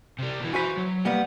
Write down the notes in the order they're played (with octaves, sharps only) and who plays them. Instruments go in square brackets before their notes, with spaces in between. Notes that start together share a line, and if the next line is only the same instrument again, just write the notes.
[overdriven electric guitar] C3 G3
B2 E3
[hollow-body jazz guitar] F#4 C5 B5 [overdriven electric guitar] B4 G#5
[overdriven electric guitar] F#3
[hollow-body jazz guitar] G3 A#3 B3 [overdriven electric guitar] F#5